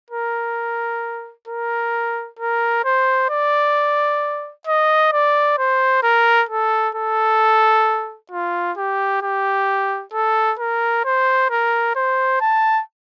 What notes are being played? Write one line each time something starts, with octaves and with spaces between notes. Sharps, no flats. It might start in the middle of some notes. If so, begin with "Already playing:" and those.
A#4
A#4
A#4
C5
D5
D#5
D5
C5
A#4
A4
A4
F4
G4
G4
A4
A#4
C5
A#4
C5
A5